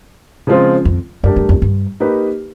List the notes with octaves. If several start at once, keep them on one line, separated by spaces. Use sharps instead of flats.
C#3 F3 G#3 C4 F4
F2
F#2 A3 D4 G4 A#4 D5
G2
F2
G2
A#3 D#4 G4 B4